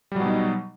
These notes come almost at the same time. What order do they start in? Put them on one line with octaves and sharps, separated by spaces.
G3 F#3 B2 D#4